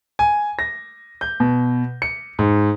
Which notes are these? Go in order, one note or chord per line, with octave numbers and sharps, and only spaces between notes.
G#5
A#6
G6
B2
C#7
G#2